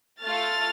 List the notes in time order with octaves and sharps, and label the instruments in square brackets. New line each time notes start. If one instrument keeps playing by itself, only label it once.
[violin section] A3 F4 A4 F6 A6